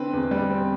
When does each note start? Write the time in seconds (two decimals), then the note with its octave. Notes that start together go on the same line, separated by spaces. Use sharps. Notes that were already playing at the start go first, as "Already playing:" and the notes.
Already playing: D3 C4 B4
0.13 E2
0.31 G3
0.50 C4